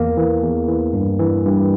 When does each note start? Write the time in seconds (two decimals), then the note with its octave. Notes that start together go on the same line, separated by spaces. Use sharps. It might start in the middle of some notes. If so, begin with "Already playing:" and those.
Already playing: E2 A#3
0.17 E3
0.43 E2
0.68 E3
0.93 G2
1.19 E3
1.45 G2